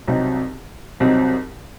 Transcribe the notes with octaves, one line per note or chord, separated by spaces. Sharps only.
C2 C3 F#3 C4 D#4
C2 C3 F#3 C4 D#4